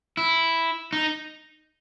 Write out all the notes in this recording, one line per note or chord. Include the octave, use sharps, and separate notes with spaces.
E4
D#4